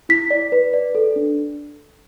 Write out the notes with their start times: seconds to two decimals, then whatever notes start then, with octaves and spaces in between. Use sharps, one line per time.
0.09 E4 B6
0.30 D5
0.52 B4
0.73 D5
0.95 A4
1.16 D4